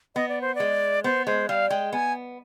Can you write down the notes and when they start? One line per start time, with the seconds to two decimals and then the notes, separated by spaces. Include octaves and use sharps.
0.15 B3 D#5
0.29 D5
0.41 C5
0.55 G#3 D5
1.04 B3 C5
1.27 G#3 C5
1.49 G3 F5
1.70 G#3 G5
1.93 B3 G#5